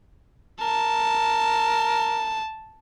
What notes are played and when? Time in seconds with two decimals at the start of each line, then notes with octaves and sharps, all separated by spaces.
0.61 A#4 A5